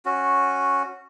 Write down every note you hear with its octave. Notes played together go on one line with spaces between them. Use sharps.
C#4 F#4